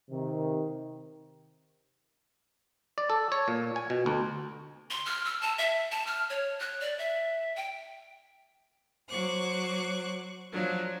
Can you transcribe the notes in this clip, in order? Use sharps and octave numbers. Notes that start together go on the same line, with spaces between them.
C3 D#3
D5
A4
C#5
A#2
G#5
B2
D2
C6
F6
E6
A5
E5
A5
F6
C#5
F#6
D5
E5
G5
F#3 C5 C#6 D6 F#6
F3 F#3 D4